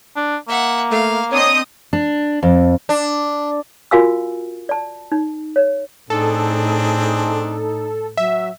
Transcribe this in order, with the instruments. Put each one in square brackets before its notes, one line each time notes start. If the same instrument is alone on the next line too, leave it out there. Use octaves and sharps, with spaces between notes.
[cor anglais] D4
[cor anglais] A#3 [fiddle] E5 F#5
[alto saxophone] A3 [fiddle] F5
[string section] C4 D#6 [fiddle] D4 D#5 [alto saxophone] C#5
[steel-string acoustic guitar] D4
F2
[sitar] D4
[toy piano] F4 F#4 A#4 F5 G#5 E6
D5 A5
D#4
C#5
[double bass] A2 [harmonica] C4 D4 G#4 [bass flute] D#4 [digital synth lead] A4
[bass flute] F#3 [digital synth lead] E5